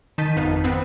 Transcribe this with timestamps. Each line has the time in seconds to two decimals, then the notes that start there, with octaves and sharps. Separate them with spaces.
0.18 D#3 D#4 A5 G6 B6 D#7
0.36 G#1 F2 B3 D#4 F5
0.64 B3 C4 B4